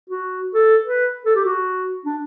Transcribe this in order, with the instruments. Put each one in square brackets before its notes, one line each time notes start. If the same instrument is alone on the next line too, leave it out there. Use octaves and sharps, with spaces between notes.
[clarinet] F#4
A4
B4
A4
G4
F#4
D4